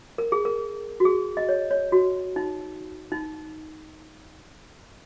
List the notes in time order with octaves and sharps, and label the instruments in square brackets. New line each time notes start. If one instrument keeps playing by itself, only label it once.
[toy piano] A#4
G#4
A#4
F#4
G#4
D#5
C#5
C#5
F#4
D#4
D#4